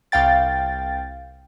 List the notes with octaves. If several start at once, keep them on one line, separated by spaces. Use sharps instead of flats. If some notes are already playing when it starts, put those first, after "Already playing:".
C2 F5 G5 A6